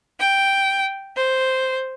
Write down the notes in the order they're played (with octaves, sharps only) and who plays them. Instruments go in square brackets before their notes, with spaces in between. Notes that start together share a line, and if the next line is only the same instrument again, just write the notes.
[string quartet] G5
C5